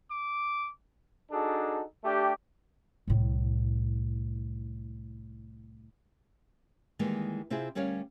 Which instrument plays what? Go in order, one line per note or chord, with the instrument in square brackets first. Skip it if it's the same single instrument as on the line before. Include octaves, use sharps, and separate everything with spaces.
[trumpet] D6
[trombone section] D4 D#4 F#4 G#4 A4
A3 D4 G4
[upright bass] C2 A2
[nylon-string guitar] D#3 E3 G3 G#3 A#3
C3 C4 E4 F4 G#4
D2 G3 C#4 A#4 C#5 F5